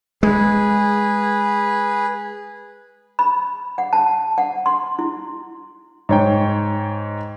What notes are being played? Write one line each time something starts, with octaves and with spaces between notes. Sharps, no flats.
G#3 G#4 B4
B5
F#5
A5
F#5
C6
E4
G#2 C#5 G5